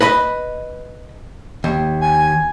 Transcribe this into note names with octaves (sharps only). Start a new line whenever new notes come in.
B4 D#5 B5
D#2
G#5